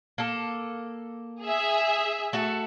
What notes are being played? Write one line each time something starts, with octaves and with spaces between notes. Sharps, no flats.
A#3 A4
G#4 E5
A3 F#4 A4